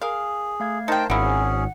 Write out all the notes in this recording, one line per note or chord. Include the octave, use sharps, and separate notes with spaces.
G#4 A#4 F5
A3 F5 G#6
D#4 A#4 C5 G5 A5
G#1 A#3 C#4 E4 G#4 F#5